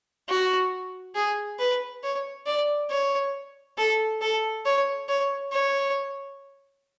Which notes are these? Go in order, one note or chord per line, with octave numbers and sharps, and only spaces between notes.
F#4
G#4
B4
C#5
D5
C#5
A4
A4
C#5
C#5
C#5